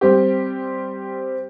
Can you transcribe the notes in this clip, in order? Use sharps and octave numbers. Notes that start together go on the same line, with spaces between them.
G3 C4 G4